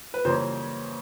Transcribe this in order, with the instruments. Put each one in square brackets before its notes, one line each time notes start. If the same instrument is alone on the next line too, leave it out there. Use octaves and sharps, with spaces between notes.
[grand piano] B4
C#3 E3 G3 A#3 C#4 C5